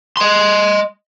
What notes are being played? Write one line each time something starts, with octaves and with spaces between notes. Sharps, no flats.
D#5 C6